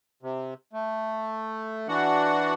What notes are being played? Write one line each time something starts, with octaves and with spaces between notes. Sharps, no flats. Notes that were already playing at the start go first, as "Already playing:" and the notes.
C3
A3
E3 D4 F#4 F#5